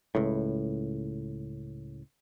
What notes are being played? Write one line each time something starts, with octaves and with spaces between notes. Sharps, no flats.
C#2 A2